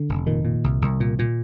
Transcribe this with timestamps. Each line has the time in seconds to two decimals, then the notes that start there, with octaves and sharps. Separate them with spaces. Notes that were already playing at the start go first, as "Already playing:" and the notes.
Already playing: D3
0.09 F1
0.27 A#2 D#3
0.45 A#2
0.64 C2
0.82 C2
1.00 A#2
1.19 A#2